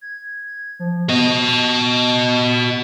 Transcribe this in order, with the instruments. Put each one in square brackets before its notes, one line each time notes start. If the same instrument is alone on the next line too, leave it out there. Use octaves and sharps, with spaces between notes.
[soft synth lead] G#6
F3
[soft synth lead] B3 [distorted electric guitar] F#4 D#5